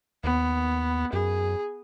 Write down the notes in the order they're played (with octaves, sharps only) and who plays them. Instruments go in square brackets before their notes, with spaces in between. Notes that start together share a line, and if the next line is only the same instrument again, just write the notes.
[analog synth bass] D#2 [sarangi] B3
[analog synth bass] F#2 [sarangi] G#4